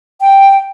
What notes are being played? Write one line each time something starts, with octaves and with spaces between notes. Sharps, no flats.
G5